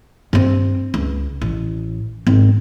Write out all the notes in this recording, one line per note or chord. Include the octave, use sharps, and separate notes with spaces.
G2 C4
C#2
A1
G#2 C4